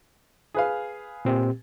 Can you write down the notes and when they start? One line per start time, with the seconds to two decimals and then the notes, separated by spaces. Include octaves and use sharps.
0.54 G#4 B4 F5
1.25 A#2 C4 G4